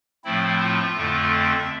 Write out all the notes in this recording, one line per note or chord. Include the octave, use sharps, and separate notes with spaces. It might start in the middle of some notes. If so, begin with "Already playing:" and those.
A2 F3 A3 C4 E4
F4
F2 D3 A3 C4
E5